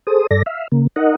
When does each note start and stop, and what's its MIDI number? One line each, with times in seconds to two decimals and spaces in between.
0.07 0.27 68
0.07 0.27 69
0.07 0.27 72
0.07 0.27 87
0.31 0.42 43
0.31 0.42 69
0.31 0.42 74
0.31 0.42 94
0.46 0.68 76
0.46 0.68 77
0.72 0.87 49
0.72 0.87 58
0.96 1.15 63
0.96 1.15 70
0.96 1.15 75
0.96 1.15 78